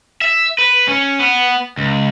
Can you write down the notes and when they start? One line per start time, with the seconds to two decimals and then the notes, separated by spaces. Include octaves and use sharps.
0.21 E5
0.59 B4
0.88 C#4
1.20 B3
1.77 C#2